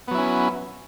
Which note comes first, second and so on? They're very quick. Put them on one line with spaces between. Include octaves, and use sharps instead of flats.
B3 F#3 E4 C#4